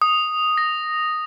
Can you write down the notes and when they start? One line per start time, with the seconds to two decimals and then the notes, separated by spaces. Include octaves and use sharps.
0.02 D#6
0.58 A#6